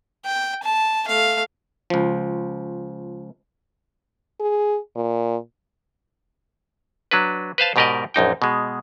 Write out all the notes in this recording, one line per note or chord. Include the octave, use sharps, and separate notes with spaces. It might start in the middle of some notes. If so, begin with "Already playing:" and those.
G5
A5
A3 F5
C#2 F3
G#4
A#2
F#3 D4 B4
B4 C5 F5 A5
G#2 B2 G4 A#4 D5 D#5
A#1 F#2 D#4 G5
B2 G#3